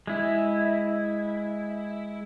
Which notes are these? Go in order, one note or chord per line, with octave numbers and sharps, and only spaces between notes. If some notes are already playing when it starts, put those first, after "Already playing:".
G#3 E4